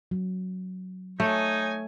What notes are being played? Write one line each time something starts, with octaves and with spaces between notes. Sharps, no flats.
F#3
A3 D#4 C#5 G#5